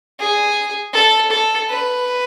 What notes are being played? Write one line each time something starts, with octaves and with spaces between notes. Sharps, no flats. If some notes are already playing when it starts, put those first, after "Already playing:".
G#4
A4
A4
B4